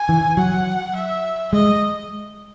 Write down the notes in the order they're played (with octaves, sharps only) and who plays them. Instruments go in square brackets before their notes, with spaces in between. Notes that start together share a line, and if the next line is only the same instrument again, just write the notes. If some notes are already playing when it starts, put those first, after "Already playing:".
Already playing: [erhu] G#5
[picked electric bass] E3
[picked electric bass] F#3 [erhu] F#5
[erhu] E5
[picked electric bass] G#3 [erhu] D#5